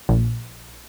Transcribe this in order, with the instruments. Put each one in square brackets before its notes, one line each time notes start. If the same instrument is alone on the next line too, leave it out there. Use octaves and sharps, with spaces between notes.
[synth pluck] A#1